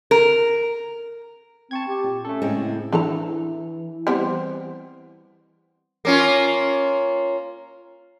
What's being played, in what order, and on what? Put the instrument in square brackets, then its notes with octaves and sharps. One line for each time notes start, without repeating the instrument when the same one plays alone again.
[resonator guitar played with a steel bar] A#4
[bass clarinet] C4 [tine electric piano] A5 C#6 G#6
[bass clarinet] G4
[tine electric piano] A#2
[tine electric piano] A3 A4 [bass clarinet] C#4
[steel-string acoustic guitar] A2 G#3 C4 [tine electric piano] C#3
[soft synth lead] E3 [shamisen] D4 A4 A#5
[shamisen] G3 B3 C4
[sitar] A#3 C#4 F4